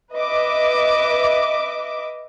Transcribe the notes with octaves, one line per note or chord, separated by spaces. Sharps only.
B4 D#5 E5 D6